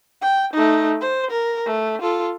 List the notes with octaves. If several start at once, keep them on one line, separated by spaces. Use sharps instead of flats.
G5
A3 D#4
C5
A#4
A3
F4 A4